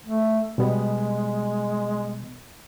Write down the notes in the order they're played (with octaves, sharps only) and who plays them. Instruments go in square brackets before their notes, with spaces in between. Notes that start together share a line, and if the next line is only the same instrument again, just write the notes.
[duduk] A3
[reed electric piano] B2 G3 B3 [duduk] G#3